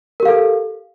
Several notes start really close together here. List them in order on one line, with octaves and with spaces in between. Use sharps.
A#4 G4 F5 A4